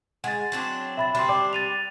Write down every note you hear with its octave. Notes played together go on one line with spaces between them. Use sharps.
G#3 F#5 A6
F#3 C4 D4
E5 B5 A6
G3 C4 D4 B5 C6
D5 G5 D6
A6 D#7 F7